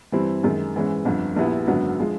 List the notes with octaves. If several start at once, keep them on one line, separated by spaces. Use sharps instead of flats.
G2 E3 G3 C4 E4
F#2 D#3 G#3
G#2 E3 G#3 C#4
G1 F2 D3
A#1 A#2 G3 B3 E4
G#1 F#2 D3 F#3 B3
D3 F3 G#3